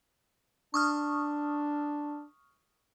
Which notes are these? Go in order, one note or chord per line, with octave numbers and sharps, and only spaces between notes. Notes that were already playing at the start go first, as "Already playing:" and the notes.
D4 C#6 D#6 F6